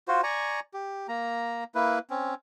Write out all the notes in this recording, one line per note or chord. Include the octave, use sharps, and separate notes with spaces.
F4 F#4 C5
D5 G#5 A#5 C#6
G4
A#3 A#5
A#3 E4 B4
C4 C#4